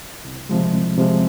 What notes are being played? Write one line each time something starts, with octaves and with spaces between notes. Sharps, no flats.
C2
C3 F3 G#3
C2
C3 F3 G#3